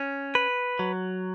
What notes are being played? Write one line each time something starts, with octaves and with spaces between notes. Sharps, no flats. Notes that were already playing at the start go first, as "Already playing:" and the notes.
Already playing: C#4
B4
F#3